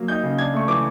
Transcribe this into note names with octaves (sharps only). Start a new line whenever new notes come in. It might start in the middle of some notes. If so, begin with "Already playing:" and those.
Already playing: F#3 A#3
D#4 G6
C#3
D4 G#6
A3 C#6
E3 D6